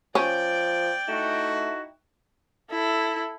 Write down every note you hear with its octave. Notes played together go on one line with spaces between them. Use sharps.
F3 C#4 D5 G5
A3 D#4 E4 F#4
E4 A4